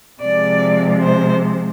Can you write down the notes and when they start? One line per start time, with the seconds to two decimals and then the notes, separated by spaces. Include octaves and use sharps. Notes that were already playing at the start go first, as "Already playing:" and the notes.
0.21 C3 F3 G#3 D5
1.02 C5